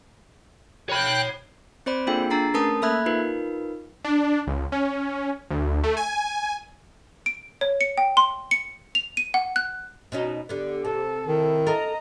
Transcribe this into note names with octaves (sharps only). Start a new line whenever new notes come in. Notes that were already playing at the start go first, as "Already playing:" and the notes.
C#5 G5 B5 F#6
C4 C5 D5 B5
A#3 D4 F4 G#4 A4 G5
D4 G#4 A#5 A6 C7
A3 C#4 A#4 B4 A5 D#6
A#3 A4 E5 B5 F#6 G#6
D#4 F4 A#4 B4
D4
C#2
C#4
D2
A3
G#5
D7
C#5
C#7
G5
C6
C#7
F7
D#7
F#5
F#6
B2 C#4 D#4
D3 B3 G4
C3 A4
D#3 E4
A4 A#4 D#5 A#5